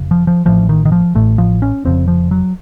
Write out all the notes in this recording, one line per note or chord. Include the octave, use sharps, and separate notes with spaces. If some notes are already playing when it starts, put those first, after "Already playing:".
Already playing: F1 C#3
F3
F3
A1 A2 F3
D#3
D#3
F3
A1 A2 A3
F3
C#4
F1 F2 C#3 C4
F3
F#3